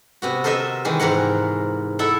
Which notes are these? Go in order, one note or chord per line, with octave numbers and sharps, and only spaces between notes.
C3 B3 F#4
A4 A#4 C5 D#5 E5
D#3 E3 G#3
G#2 E3 A#4 F#5
E4 A4 E5 F#5